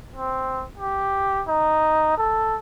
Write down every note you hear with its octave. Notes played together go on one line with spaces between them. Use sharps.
C4
G4
D#4
A4